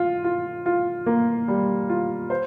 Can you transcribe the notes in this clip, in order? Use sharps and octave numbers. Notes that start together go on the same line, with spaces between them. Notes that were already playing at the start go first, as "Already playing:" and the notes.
Already playing: F4
F4
F4
A#3
G3
F4
C5